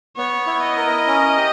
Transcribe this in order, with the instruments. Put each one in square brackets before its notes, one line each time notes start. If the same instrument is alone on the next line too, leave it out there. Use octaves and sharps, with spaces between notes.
[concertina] B3 [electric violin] C#5
[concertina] E4
[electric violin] D#5
[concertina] A#4
C#4
G4